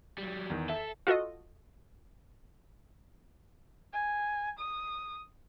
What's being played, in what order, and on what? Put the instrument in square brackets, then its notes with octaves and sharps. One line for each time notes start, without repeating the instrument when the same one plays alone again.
[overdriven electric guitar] F#3 G3
[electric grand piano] E2 D#3
[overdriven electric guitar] A4 [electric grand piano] E5
[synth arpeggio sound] F4 F#4 A4 D#5
[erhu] G#5
D#6